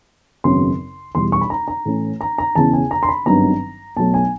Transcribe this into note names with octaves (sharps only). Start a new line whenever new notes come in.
G#1 F#2 C#3 F#3 B3 C6
E2 B2 G3 C6
C#6
B5
A#5
A#5
A2 E3 A3 C#4
A#5
A#5
E1 E2 C#3 E3 A5
G#5
A#5
C6
B5
G#1 G2 D#3 F#3 B3 A#5
B1 B2 F#3 A3 A5
G#5